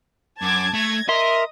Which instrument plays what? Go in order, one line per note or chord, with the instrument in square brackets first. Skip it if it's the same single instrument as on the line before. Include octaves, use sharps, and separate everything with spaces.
[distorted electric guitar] F#2 [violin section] A5 D6 G#6
[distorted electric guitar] A3 [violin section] G#6 A#6
[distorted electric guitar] A#4 [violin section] D#5 D#6 [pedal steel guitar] E5 C6